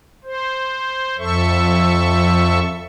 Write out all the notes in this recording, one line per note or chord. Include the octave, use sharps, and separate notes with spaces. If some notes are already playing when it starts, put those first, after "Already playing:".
C5
F2 A4 E5 C#6